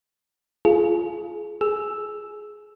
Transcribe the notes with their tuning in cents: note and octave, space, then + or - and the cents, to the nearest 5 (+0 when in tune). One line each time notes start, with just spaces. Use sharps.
F4 -15 G#4 +25
G#4 +20 E6 +0